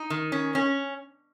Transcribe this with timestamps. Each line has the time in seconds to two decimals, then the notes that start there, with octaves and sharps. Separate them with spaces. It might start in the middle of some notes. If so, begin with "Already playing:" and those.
Already playing: D#4
0.10 D#3
0.32 C#4
0.55 C#4